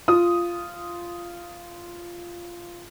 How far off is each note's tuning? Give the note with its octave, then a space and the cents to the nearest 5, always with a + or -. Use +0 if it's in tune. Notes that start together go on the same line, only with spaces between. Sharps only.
F4 -10 D#6 +0